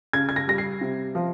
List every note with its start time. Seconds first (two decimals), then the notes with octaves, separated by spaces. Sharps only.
0.13 C#3 G#6
0.29 G#6
0.36 A#6
0.47 G3 A#6
0.58 C7
0.81 C3
1.15 F3